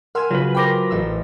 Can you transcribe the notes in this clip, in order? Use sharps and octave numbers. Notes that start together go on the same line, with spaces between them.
A#4 F#5 G#5 C6 E6 F6
C#3 F#3 F4 B4
A#4 C5 G5 B5 D6 A#6
A1 E6